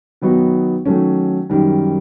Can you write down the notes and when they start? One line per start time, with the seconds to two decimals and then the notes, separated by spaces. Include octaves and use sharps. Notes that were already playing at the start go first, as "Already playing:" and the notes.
0.21 D#3 F#3 B3 D#4 F#4
0.86 D#3 F#3 A3 C#4
1.50 F#2 D#3 G3